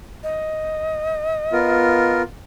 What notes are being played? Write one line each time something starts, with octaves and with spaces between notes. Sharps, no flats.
D#5
B3 F4 A#4